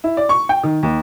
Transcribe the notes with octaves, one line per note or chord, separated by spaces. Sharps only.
E4
D5
C#6
G5
D#3
D#2